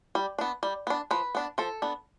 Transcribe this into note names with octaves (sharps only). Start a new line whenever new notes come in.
G3
B3 D4
G3
B3 D4
F3 B4
B3 D4
F3 A4
B3 D4